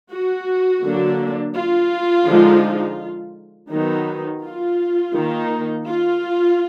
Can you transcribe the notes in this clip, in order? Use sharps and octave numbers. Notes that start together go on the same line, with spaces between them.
F#4
D3 F#3 A#3 D4
F4
D3 F3 G#3 D#4
D#3 F#3 B3 D#4
F4
D#3 A#3 D#4
F4